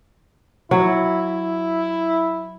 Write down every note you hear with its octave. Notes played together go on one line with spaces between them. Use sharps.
F#3 E4